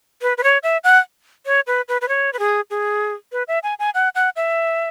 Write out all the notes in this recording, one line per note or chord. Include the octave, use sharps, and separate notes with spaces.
B4
B4
C#5
E5
F#5
C#5
B4
B4
B4
C#5
B4
G#4
G#4
B4
E5
G#5
G#5
F#5
F#5
E5